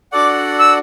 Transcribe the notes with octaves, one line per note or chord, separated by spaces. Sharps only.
D4 F#4 A4 D5 F#5 D6
E6